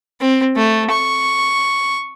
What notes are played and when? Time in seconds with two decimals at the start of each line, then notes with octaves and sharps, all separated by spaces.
0.21 C4
0.56 A3
0.91 C#6